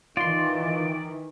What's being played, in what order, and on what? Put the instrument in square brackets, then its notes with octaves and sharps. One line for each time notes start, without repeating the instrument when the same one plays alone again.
[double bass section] D#3 E3 [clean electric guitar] F4 C6 [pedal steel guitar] D5